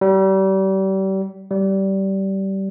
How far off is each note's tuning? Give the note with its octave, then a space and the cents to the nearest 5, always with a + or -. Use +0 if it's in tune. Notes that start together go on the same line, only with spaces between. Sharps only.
G3 -35
G3 -20